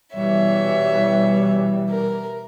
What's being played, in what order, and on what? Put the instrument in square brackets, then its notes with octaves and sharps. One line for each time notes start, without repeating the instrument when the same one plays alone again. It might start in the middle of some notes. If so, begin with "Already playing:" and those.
[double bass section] B2 E3 G3 [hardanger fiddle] C#5 E5
[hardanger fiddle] A#4